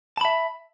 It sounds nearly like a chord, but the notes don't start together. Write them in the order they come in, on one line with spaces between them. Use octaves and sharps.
A5 B5 E5